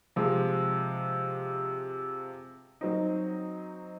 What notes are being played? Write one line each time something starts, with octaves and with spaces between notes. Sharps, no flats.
C3 F3 G#3
F#3 C4 D#4